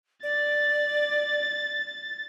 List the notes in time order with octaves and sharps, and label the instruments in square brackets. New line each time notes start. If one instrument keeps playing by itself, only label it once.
[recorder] D5 [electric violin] A6